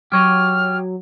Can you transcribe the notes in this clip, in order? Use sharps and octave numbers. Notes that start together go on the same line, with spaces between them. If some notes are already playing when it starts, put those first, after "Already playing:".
F#3 G4 C#5 D#5 F6